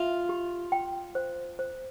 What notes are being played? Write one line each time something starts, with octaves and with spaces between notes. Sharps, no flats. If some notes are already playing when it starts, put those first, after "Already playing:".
Already playing: F4 E5
G4
G5
C5
C5